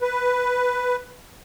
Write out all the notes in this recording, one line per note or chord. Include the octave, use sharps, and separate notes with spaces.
B4